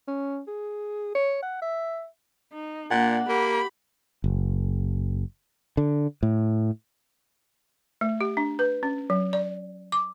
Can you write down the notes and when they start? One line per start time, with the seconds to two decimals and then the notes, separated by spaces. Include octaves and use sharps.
0.07 C#4
0.48 G#4
1.15 C#5
1.42 F#5
1.62 E5
2.53 D#4
2.91 A#2 A#3 D4 F#5
3.29 A#3 G4 B5
4.24 F#1
5.77 D3
6.23 A2
8.01 A3
8.21 G4
8.37 D4
8.59 B4
8.83 C#4
9.10 F#3
9.33 D5
9.92 D6